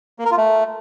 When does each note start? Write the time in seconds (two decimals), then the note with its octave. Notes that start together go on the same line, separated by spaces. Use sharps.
0.19 A#3
0.25 A#4
0.31 F4
0.37 A3